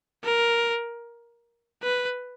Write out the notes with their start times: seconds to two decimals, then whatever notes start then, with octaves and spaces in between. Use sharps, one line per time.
0.24 A#4
1.83 B4